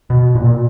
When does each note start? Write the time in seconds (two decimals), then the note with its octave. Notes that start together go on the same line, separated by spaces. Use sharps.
0.10 B2
0.35 A#2